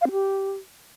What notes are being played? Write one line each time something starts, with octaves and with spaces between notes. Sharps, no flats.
F5
C4
G4